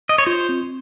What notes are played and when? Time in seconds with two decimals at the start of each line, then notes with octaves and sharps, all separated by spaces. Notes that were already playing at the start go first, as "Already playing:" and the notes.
0.09 D#5
0.18 C#5
0.26 F4 C5
0.49 C4